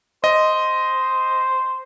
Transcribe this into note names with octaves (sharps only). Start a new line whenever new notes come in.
C5 D#5